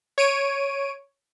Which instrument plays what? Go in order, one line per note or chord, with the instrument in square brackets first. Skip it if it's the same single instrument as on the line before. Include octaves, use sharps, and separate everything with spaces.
[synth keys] C#5 D7 D#7